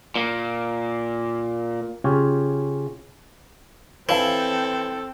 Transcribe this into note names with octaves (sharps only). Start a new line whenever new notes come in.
A#2 A#3
C#3 C#4 F4 G4 C#5
E3 C4 A4 C#5 F5 A5